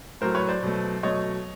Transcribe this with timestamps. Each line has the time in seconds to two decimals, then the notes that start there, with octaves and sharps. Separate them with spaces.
0.21 A2 F#3 A3 A#4 C5
0.35 B4 C#5
0.48 C5 D5
0.62 B2 F#3 A3
1.03 B2 F#3 A3 C#5 D#5